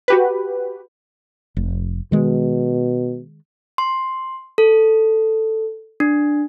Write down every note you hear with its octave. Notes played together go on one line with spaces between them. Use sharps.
F#4 G4 B4
F1
B2 D#3 G#3
C6
A4
D4